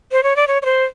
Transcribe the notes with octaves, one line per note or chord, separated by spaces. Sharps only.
C5
C#5
D5
C#5
C#5
C5